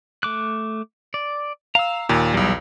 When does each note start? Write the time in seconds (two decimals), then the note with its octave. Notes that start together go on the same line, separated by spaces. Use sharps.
0.23 A3 D6 F#6
1.14 D5
1.75 F5 A#5 E6
2.09 D#2 A#2
2.34 B1 E2 G3